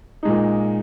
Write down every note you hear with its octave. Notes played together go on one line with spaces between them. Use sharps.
A#2 G#3 D#4